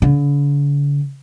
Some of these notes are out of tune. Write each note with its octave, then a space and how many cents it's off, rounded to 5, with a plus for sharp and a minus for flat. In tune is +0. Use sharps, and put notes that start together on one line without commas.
D3 -45